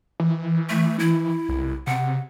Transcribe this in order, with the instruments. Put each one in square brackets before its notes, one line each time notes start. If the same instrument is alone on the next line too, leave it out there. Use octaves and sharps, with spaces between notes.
[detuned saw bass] E3
[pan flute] A3
E4
[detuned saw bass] C2
[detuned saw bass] C3 [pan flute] F#5